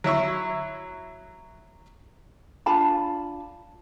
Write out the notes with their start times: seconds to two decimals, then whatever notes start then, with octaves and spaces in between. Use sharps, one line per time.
0.04 F#3 E4 E5 C#6
2.66 D4 F4 A5 B5